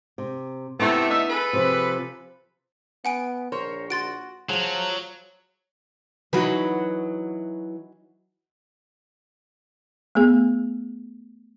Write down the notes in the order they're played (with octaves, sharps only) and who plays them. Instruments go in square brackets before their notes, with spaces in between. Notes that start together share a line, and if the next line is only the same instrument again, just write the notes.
[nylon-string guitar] C3
[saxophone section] C3 A3 [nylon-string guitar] B3 E4
[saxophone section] D4 D#4 E5
G#4 A4 B4
[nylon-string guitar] C3 F3
[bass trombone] B3 [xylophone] F#5 G#5 D7
[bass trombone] A#1 [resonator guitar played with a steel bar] A#4 C5 C#5
[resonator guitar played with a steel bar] F#4 [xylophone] C6 A6 D7
[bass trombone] F3 [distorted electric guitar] F#3 [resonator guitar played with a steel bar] G#4 [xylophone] E7 F#7
[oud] E3 F#3 [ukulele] D#4 F#4 B4
[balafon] A3 B3 G#4